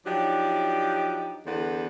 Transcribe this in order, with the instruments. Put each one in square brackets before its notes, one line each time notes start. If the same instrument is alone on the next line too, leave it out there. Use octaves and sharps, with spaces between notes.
[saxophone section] F3 F#3 D4 D#4 G4
E2 D3 B4 C5 F#5